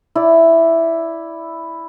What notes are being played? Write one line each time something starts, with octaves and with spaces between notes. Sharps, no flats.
E4 D5